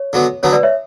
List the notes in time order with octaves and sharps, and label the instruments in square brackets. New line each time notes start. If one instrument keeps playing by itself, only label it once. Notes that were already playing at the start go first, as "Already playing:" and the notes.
Already playing: [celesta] C#5
[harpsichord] D3 F#3 B3
[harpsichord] D3 F#3 B3 [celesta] C#5
[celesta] B4 D5
C#5 E5